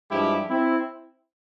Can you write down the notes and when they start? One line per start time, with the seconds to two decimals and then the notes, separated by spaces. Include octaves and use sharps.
0.10 G2 F3 G#3 E4 G4
0.50 C4 E4